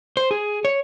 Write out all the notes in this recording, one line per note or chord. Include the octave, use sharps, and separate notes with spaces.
C5
G#4
C#5